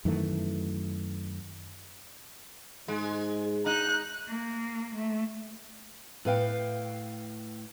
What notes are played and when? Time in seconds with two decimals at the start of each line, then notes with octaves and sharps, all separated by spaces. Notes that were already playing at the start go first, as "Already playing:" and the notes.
0.05 F#2 D#3 E3 A3
2.88 G#2 G#3
3.66 D#4 F#6
4.28 A#3
4.95 A3
6.25 A2 B4 F5 G5